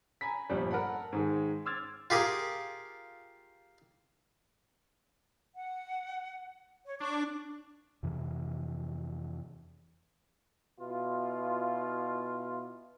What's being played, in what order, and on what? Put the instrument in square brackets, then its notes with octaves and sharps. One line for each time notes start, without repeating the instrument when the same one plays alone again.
[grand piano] G#5 A#5 B5 B6
G1 G2 A#2 F3 G3
A4 A#4 F#5 A5 B5
G#2 D#3 G#3
C6 D6 E6 F6 G#6 A6
[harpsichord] F4 G4 G#4 A#4
[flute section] F#5
C#5
[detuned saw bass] D4 [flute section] C#6 D6
[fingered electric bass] F2 C3 E3
[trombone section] B2 E4 F4